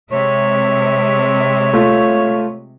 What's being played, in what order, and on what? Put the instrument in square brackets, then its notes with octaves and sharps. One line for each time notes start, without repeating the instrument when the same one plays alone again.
[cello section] C3 G#3 E5 [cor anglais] C#5
[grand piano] A3 F4